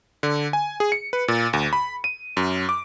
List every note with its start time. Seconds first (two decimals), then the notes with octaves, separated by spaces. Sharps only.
0.23 D3
0.53 G#5
0.80 G#4
0.92 C#7
1.13 B4
1.28 A#2
1.53 D2
1.73 B5
2.04 D#7
2.37 F#2
2.69 D6